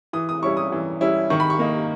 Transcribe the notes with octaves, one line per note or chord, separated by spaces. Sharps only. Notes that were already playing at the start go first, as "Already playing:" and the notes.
E3 D#6
D#6
G3 C#4 E4 C#6
D#6
E3
G3 C#4 E4
D#3 C#6
B5
C#6
A#3 D#4